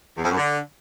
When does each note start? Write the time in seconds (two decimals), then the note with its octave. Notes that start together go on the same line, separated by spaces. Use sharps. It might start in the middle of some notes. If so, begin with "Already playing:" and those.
0.16 E2
0.23 F2
0.30 F#2
0.37 D3